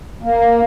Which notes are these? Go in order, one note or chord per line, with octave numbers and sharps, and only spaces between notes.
A#3